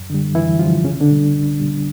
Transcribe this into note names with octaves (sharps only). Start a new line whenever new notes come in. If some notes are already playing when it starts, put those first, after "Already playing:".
Already playing: F#2
D3 G3
F#2 E3 E4
D3 F3 G3 F4
C2 C#3 C#4
D3 D4
B2 G3
C2
B2 G3